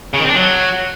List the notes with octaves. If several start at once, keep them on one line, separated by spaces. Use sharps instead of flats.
C#3
D#3
C4
D4
F#3